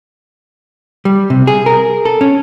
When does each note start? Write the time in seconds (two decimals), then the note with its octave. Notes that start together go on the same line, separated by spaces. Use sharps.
1.05 G3
1.30 C3
1.47 G#4
1.66 A#4
2.05 A4
2.21 C#4